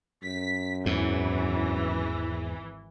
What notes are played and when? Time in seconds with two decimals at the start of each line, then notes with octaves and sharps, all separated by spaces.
0.23 F#2 B6
0.86 G#1 E2 G#2 E3